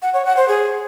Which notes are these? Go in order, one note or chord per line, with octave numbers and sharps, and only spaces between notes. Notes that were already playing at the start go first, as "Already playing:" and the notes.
F#5
C#5
F#5
C5
G#4